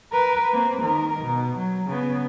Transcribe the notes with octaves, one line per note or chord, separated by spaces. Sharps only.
A#4 B4
A#3 C4
D#3 A#4
B2
F#3
C#3 B3